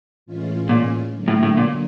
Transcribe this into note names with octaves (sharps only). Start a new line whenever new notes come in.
A2 E3 G#3 C#4 F4
A#2
D3 F#3 A#3
A2
A2
A#2